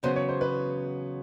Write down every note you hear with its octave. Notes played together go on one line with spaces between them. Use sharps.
E2 C#3 F#3 B3 C5
C#5
C5
B4